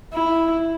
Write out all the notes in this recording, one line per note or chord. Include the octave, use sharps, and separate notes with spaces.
E4